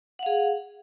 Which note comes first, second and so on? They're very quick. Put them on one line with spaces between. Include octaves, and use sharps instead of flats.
F#5 F5 G#4